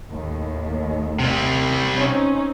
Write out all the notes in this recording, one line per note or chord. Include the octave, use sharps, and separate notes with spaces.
D#2 A2
C3 G3
C4 C#4 D#4